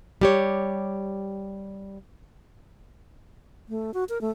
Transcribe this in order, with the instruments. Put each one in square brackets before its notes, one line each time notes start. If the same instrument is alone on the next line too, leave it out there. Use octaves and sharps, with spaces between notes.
[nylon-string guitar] G3 G4 C#5
[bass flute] A3
F#4
A#4
A3